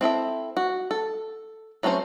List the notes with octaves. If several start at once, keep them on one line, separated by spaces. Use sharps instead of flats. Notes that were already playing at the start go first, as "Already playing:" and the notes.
C4 E4 A4 E5
F#4
A4
F#3 A3 C4 C#4 C5